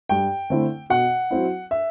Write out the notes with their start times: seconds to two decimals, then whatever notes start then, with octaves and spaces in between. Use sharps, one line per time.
0.09 G2 G5
0.50 D3 A3 C4 E4
0.90 B2 F#5
1.31 F#3 C4 E4
1.71 E5